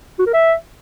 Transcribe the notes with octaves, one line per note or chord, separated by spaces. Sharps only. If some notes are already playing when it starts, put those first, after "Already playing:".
F#4
A#4
E5